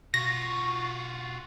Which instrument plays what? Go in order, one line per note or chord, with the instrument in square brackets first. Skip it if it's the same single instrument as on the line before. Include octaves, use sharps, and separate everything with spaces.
[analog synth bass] B2 [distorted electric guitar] F4 F#4 [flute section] C#6 [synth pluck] A#6